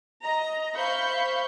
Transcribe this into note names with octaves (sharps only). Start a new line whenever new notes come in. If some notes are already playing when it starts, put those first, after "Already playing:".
D#5 A#5
C5 E5 F5 B5 C#6 G6